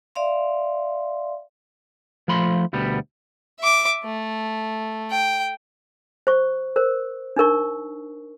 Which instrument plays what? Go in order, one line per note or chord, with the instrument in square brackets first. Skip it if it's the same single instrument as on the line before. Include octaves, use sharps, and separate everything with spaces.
[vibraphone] D5 E5 F5 C6
[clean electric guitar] F3 A3 B5 C6
D2 B2 G3 B3
[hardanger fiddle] E5 D6
A3
G5
[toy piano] C5 C#6
A#4 C5
D4 D#4 A#4 C#6